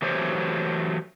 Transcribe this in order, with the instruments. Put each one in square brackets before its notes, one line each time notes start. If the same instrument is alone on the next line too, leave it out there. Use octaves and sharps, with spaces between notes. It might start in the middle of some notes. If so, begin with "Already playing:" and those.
[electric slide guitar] E3 F#3 A3 G4 C5 C#5